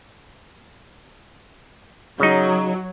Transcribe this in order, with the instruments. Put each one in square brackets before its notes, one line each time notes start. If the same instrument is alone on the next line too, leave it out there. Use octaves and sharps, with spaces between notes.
[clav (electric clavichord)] C#3 D#4 [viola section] F#3